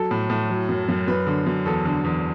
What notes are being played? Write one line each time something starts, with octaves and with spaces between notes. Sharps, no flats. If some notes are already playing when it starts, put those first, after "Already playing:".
Already playing: F#3 A4
A2
A2
F#3
F#2
F#2
F#2 B4
D3
F#2
E2 A4
D3
E2